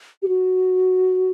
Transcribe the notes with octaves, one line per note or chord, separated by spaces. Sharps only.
G4
F#4